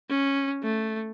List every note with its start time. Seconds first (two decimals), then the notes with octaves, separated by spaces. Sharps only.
0.10 C#4
0.63 A3